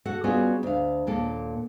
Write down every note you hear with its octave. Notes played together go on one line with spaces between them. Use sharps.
F#4 A4 F#5
G3 B3 C#4 F4 F#4 G#4
D2 F5
D#2 A#2 A#3 A4